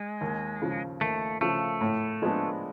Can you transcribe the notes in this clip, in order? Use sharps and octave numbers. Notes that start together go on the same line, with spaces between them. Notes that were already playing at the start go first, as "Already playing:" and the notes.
Already playing: G#3
D#2
C#3 F3
D#2 A3
C#3 F3 A3
A2
F3 G#3 B3 D4